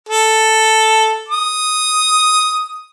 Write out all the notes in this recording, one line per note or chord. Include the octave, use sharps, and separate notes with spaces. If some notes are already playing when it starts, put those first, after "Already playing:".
A4
D#6